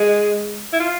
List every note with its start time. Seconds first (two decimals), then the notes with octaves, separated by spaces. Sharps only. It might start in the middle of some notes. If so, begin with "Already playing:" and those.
Already playing: G#3
0.73 E4
0.80 F4